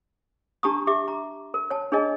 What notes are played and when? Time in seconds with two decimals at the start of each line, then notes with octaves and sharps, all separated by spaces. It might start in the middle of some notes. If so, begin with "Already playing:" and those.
0.63 D4 G4 A5 A#5 C#6 D#6
0.87 G4 E5 D6
1.08 A#5
1.54 A#4
1.70 C#5 A5
1.92 D4 G#4 A#4 C#5 D#5 G#5